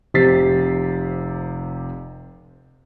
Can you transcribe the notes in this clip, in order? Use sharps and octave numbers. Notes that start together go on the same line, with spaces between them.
F1 C3 G4 A6 B6 C7